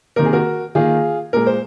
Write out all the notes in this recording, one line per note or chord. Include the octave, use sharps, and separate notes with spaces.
C3 D#3 A#3 A#4
G#4
F#4 A#4
D#3 A#3 F4 G#4
A#2 G#3 A#4
C5